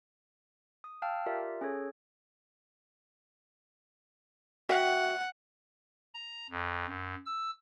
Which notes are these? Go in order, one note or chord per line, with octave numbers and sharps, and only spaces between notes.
D#6
F5 G5 A5 E6 F6
F4 G4 A#4 D5 E5
C#4 G#4 A4 C#5
F#4 E5 F#5 G5
A#5
F2
F#2
E6